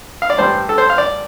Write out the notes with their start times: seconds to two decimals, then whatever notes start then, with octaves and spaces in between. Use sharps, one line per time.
0.22 F5
0.30 D5
0.38 A1 G2 G3 C5
0.69 A4
0.78 C5
0.90 F5
0.98 D5